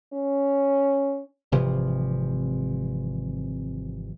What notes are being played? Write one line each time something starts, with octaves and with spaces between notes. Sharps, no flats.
C#4
G#1 C3 E3 F3